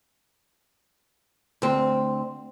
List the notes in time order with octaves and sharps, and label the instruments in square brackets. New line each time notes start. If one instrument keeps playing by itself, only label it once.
[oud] D2 C4